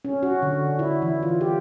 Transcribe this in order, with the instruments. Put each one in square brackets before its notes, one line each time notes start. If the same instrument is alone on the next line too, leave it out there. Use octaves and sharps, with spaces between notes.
[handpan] C#4
F#4
D3
E4
E3
F4
G4